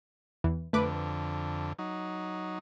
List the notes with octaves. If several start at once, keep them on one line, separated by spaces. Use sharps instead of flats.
E2 E3
F2 D3 A3 B4 D6
F#3 D#4